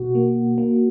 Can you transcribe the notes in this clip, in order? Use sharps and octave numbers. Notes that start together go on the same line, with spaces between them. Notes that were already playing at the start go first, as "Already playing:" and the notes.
Already playing: B2 F#4
A#3
A#3